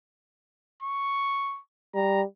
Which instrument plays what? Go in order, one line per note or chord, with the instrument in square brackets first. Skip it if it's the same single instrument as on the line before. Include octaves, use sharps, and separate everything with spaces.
[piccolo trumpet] C#6
[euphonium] G3 [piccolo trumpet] A#5